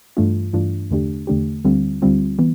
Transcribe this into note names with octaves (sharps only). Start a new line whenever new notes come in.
G2 E3 A3 D4 F4
G2 E3 A3 D4 F4
E2 D3 A3 D4 G4
E2 D3 A3 D4 G4
D2 D3 G3 C4 F4
D2 D3 G3 C4 F4
E3 B3